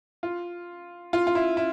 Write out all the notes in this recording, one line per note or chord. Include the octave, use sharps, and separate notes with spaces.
F4
F4
F4
E4
E4